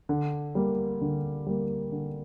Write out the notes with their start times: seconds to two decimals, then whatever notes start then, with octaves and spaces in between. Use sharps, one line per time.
0.09 D3
0.55 G3 A#3
1.01 D3
1.47 G3 A#3
1.92 D3